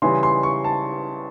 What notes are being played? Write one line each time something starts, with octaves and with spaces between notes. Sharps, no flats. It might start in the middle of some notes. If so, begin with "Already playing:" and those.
C#3 E3 G3 C6
C6
C#6
A5